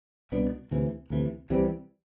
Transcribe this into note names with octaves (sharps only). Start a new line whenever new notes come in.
C2 B2 B3 D4
D2 C3 E3
D2 C3 E3
C2 C3 E3 G3